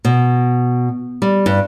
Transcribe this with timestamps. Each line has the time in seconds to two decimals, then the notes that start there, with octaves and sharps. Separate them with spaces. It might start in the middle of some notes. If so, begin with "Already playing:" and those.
0.05 B2
1.22 G3
1.46 G2